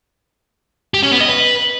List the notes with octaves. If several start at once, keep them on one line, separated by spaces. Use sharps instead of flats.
G4
C#4
B3
D#5
B4